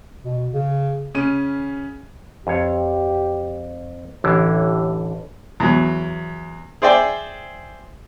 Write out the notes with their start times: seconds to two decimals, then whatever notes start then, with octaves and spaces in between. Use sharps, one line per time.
0.25 B2
0.54 C#3
1.14 C#3 C#4 D#7
2.47 F2 G4 C#5
4.24 A1 A2 D3 E3
5.60 E2 F#3
6.82 G#4 C5 D5 E5 G5